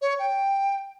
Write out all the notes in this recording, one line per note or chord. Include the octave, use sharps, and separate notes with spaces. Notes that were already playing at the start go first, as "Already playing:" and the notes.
C#5
G5